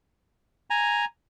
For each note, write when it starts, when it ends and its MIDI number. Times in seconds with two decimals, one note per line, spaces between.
0.70 1.05 80
0.70 1.05 82